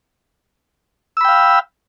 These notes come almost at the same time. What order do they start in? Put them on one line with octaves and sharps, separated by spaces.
E6 B5 G5 F5